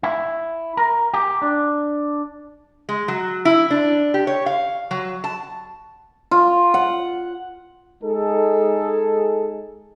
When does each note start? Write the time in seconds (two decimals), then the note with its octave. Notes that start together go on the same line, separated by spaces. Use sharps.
0.03 E4
0.77 A#4
1.14 G4
1.42 D4
2.89 G#3
3.08 F#3
3.45 E4
3.70 D4
4.14 G4
4.27 C#5
4.46 F5
4.91 F#3
5.24 A5
6.31 F4
6.74 F#5
8.03 G#3 D#4 G#4 A4